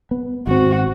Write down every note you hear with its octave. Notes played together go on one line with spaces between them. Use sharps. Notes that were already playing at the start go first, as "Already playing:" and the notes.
B3
G#1 C4 F#4